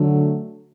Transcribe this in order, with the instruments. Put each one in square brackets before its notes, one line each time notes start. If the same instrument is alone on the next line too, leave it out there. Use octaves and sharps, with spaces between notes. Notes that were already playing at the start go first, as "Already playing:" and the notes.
Already playing: [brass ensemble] D3 F#3 A3